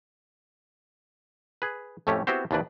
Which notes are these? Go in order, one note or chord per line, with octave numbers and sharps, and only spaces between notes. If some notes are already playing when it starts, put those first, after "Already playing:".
G#4 B4
F2 A2 A3 C#4 G4
B3 C4 E4 F#4 G4 C5
D#2 C3 E3 D4 B4 D5